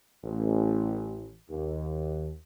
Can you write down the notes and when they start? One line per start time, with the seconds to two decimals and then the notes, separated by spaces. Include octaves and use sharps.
0.24 A1
1.49 D#2